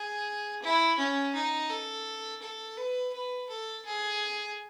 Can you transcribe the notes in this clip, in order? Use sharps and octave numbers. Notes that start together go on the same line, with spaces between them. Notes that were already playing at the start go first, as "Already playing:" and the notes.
Already playing: G#4
E4
C#4
D#4
A4
A4
B4
B4
A4
G#4